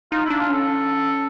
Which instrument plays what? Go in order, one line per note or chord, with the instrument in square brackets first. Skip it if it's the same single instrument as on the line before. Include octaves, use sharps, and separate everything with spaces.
[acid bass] D#4 [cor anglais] F4
[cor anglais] E4
[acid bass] D4
[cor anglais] F4
[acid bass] C#4 [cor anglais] A4